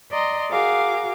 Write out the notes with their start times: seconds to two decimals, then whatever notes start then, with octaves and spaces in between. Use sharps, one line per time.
0.11 D5 D#5 A#5 C6
0.52 F#4 G#4 A#4 F5 D6